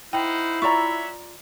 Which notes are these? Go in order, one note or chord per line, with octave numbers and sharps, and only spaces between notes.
D#4 E4 C5 F#5 G5
F4 C#5 D5 E5 F#5 A#5 C#6